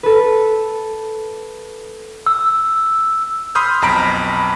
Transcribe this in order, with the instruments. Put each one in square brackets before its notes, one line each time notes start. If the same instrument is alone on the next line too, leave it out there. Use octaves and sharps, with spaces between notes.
[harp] A4 B4
[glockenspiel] E6
[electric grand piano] B5 C6 D#6 F6 G6
B1 F2 A#5 B5 D7